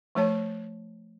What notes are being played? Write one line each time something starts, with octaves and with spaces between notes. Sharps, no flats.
F3 A3 C#5 A5